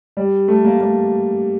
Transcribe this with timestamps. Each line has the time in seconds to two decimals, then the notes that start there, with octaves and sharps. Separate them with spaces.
0.17 G3
0.48 A3
0.65 A#3
0.80 A#3